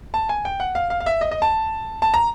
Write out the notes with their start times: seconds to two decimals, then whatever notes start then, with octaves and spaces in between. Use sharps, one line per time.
0.14 A5
0.29 G#5
0.45 G5
0.60 F#5
0.75 F5
0.90 F5
1.00 F5
1.06 E5
1.21 D#5
1.31 D#5
1.42 A5
2.02 A5
2.14 A#5